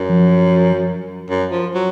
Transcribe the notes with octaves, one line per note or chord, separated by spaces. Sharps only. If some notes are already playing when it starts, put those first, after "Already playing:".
Already playing: F#2
F3
F#2
F3
F#3